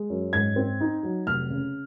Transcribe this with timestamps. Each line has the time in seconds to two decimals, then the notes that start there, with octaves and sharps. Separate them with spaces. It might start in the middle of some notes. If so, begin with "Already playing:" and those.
Already playing: G#3
0.10 F#2
0.33 G#2 G#6
0.56 C4
0.80 D#4
1.03 F#3
1.27 F1 F6
1.50 C#3